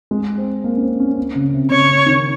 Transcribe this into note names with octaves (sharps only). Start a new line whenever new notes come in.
G#3
C4
A#3
C#4
C4
C#4
A#3
C#3
C3
C#3 C#5
C#3
D#3